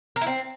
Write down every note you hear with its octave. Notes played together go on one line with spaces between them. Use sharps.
A#4
E4
C4